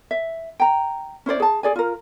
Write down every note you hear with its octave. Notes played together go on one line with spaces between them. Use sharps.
E5
G5 A#5
C#4 E4 C5 D5
G#4 A5
G#4 D5 G#5
F4 A#4